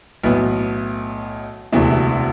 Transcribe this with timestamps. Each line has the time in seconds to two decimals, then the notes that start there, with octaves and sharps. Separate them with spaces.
0.23 B1 A2 E3 B3
1.72 E1 D2 C3 E3